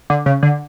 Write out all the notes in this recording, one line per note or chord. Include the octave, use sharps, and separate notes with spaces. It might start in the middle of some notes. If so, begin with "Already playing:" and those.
D3
C#3
D3